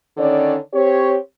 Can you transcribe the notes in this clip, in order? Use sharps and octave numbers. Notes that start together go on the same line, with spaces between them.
D3 D#3 C#4 C#5 D5
C4 G4 C#5